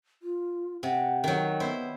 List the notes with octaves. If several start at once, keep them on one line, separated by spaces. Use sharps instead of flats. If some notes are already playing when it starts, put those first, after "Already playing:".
F4
C3 F#5
D#3 F#3
B3 E4 C5